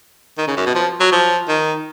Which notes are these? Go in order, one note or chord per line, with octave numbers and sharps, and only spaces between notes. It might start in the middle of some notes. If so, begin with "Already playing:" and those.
D#3
C#3
F#2
B2
F3
F#3
F3
D#3